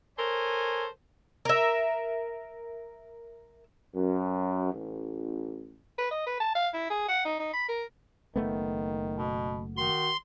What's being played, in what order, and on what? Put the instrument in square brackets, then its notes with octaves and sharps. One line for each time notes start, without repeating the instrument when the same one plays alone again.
[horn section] A4 A#4 C5 C#5 G#5
[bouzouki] A#4 E5
[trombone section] F#2
A1
[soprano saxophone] B4
D#5
B4
A5
F5
E4
G#4
F#5
D#4
D#4
B5
A#4
[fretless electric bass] F#1 A3 B3 [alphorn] D#3
[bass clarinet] B2
[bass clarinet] D#3 [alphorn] F#4 [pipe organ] C6